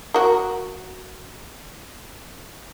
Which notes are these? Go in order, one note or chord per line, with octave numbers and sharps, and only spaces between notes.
F#4 A#4